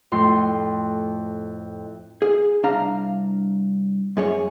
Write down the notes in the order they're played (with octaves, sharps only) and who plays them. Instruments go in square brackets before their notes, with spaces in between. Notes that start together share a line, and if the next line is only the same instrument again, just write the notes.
[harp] F2 A2 C6
[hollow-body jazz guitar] G#4
C2 D4 F5 A#5
F#2 G#4 C#5